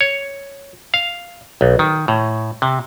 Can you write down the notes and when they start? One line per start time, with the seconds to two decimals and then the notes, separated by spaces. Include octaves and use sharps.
0.01 C#5
0.94 F5
1.61 B1
1.79 D#3
2.08 A2
2.62 C3